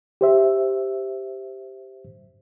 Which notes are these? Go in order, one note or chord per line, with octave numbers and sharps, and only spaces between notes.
G4 C5 E5